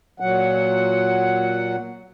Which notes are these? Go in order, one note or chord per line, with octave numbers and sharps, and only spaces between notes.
A#2 F#3 F#5